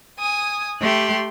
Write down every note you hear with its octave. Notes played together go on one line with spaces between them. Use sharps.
G#5 D#6
A3 G4 C6 F#6